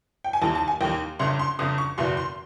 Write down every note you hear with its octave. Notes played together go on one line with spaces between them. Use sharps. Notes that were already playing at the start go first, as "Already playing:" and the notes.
G5
G#5
D#2 D#3 A5
A5
G#5
D#2 D#3 G5
G1 F2 C#3 C6
C6
G1 F2 C#3 D#6
C#6
F#1 E2 B2 C6
C6